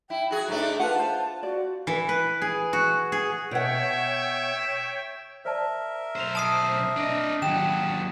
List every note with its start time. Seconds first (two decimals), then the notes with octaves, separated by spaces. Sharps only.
0.10 E4 G5
0.31 F#4 G#4
0.48 G#2 A3 D4 A#5
0.80 F4 B4 F#5 A5
0.99 C5
1.43 F#4 D5
1.87 E3
2.09 B4
2.42 G#4
2.73 F#4
3.12 G#4
3.51 B2 C#5 E5 F#5 G5
5.45 A#4 C5 D5 E5 A5
6.16 B1 C5 E7 F7
6.35 A5 D#6 C7 D7
6.96 D4 D#5
7.42 D#2 F#3 G5 E7